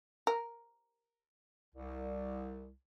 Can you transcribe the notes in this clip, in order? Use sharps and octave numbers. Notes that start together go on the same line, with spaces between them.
A#4
C2